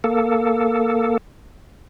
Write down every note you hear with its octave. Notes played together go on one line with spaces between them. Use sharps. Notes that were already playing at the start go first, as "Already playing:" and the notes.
A#3 A4